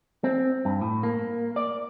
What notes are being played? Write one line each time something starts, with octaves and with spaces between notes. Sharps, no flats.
C4
G2
A2
A#3
D5